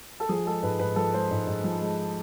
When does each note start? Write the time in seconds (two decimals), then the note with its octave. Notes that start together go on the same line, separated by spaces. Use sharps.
0.20 A4
0.29 F3 G#4
0.46 G#3 A4
0.62 G#2 B4
0.79 G#2 B4
0.96 F3 A4
1.13 G#3 C5
1.31 G#2
1.47 G#2
1.64 F3
1.81 G#3